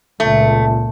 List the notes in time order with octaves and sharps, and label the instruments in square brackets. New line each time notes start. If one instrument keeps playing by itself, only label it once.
[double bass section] C#2 A#2 [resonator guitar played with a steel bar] A3